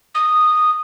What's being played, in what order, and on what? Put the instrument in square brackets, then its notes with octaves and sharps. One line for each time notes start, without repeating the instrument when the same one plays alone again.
[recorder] D#6